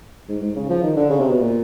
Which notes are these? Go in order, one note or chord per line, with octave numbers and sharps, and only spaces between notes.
G#2
G#2
C#3
F3
D#3
D3
C#3
C3
B2
A#2